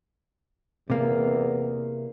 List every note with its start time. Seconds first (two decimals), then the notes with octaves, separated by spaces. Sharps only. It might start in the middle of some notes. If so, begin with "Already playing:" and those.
0.90 E2 C3 A#3